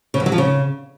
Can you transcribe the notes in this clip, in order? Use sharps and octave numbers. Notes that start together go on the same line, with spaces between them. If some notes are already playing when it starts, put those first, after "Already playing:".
C#3
E2
F#3
F3
C#3